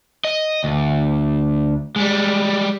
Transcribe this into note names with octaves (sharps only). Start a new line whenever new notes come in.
D#5
D2
G3 G#3